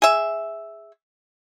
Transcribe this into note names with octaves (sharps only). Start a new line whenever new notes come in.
G#4 E5